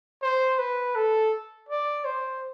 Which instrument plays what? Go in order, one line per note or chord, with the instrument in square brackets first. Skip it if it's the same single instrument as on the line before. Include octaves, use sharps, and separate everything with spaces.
[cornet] C5
B4
A4
D5
C5